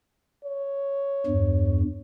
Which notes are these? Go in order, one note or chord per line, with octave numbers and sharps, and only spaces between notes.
C#5
E2 G2